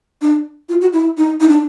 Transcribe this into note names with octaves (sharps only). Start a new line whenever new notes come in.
D4
F4
F#4
E4
D#4
D#4
D4